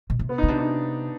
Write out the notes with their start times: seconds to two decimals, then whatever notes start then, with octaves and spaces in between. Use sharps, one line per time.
0.10 B2
0.19 C3
0.29 B3
0.38 C#3 D#4
0.48 C3 D4
0.58 D#4